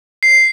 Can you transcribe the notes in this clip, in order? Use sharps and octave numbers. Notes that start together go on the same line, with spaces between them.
C7